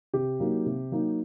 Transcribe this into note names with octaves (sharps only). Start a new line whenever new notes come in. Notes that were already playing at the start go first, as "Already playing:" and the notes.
C3 G4
F#3 A#3 D#4
C3
F#3 A#3 D#4